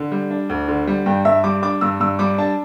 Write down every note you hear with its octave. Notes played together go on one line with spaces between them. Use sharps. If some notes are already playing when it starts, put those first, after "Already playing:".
Already playing: D3
G3
D4
D2
D3
G3
G2 G5
G2 E5
G3 D6
D4 D6
G2 E6
G2 E6
G3 D6
D4 A5